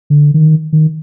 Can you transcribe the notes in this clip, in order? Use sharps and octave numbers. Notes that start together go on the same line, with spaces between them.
D3
D#3
D#3